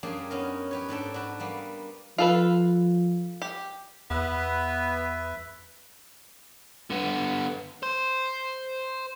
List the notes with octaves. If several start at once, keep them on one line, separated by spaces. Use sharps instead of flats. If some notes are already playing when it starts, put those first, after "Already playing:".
F#2 A#3 D4 G4 G#4
B3 C#4 D#4 A#4
G4 B4 C#5
G#2 D4 A4 G5
D4 F#4 B4
G3 A#3 B3
F3 F4 A4 B4
G4
E2 B3 B4 E5
D3 B3
C5